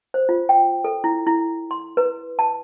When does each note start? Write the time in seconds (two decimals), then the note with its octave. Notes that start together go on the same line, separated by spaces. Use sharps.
0.14 C5
0.29 F4
0.49 G5
0.84 A4
1.04 E4
1.27 E4
1.71 C6
1.97 B4
2.39 A5